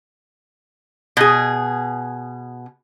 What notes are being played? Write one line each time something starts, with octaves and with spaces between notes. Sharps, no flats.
B2 G#4